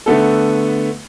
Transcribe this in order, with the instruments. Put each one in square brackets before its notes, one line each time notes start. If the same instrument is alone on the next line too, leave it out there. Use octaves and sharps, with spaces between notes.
[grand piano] D3 A3 B3 A4